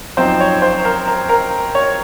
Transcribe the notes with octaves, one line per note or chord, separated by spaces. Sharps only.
F#2 F3 C4 D#4 C5
C#5
C5
A#4
A#4
A#4
C#5